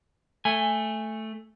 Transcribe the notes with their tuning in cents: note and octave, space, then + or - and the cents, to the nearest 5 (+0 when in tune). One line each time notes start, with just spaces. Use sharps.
A3 +0 G#5 -15